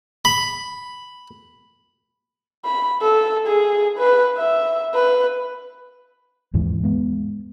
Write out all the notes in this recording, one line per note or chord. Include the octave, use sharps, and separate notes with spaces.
B5
B5
A4
G#4
B4
E5
B4
D#2 G#2 E3
G#3 B3